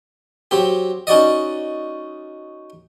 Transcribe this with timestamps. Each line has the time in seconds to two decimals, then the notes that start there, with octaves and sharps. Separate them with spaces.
0.51 F#3 C4 G4
1.07 C#4 D#4 F#4 D5 D#5